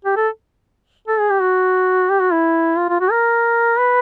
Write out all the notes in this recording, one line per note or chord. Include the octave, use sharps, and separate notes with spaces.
G4
A4
A4
G#4
G4
F#4
G4
F#4
E4
F4
F4
F#4
A#4
B4